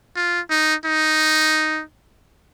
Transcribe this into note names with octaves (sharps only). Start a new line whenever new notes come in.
F4
D#4
D#4